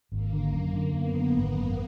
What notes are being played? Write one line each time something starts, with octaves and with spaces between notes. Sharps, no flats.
G#1 A#3
D3
F#2
D3
F#2 B3
D3
G#1
F#2